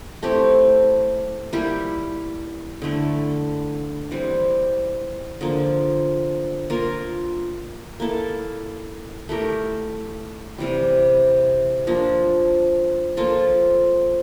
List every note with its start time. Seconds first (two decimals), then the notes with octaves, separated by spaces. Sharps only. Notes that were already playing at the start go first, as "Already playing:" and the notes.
0.23 A3 C4 E4 G4
1.53 G3 A#3 E4 G4
2.82 D3 A3 E4
4.11 E3 G3 C4
5.41 D3 F3 A#3
6.70 A#3 F4 A#4
8.00 A#3 E4 A4
9.29 A3 E4 G4 A#4
10.58 C3 E3 G3
11.87 F3 A#3 D4
13.17 F3 A#3 F4 A4